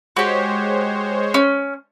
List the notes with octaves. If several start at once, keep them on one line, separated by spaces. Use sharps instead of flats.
G#3 F#4 G4 C5 C#5
C#4